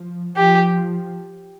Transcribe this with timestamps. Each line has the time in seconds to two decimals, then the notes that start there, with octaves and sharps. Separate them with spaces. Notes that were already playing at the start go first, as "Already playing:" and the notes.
Already playing: F3
0.36 F3 G4